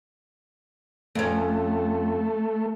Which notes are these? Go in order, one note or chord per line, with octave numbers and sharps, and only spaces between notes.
F2 A3 C#4